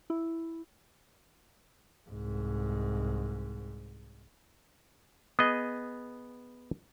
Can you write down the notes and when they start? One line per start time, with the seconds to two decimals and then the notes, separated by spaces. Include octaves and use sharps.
0.10 E4
2.09 C2 G#2
5.39 B3 G#4 D#5 D#6